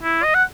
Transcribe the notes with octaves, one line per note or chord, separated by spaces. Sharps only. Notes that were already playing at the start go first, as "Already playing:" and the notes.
E4
D#5
F#5